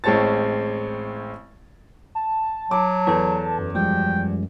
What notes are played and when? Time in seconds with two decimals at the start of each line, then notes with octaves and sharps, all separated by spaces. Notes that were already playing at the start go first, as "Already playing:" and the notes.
0.04 A1 G#3 C4 C#5 A5 A6
2.15 A5
2.71 F#3 D6
3.07 E2 A4 B4
3.59 F#2
3.75 F3 G3 G#3 G5